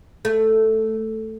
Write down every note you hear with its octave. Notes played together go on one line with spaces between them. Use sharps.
A3